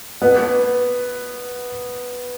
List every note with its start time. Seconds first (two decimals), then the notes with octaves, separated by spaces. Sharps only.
0.22 B3